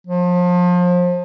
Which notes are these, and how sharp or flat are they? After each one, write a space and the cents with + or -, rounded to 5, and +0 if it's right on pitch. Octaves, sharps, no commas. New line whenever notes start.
F3 +30